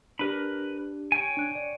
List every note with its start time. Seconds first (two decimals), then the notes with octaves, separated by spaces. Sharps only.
0.19 D4 G4 A#4 B4 B5
1.12 C#5 G5 G#5
1.37 D4 F#6
1.55 D5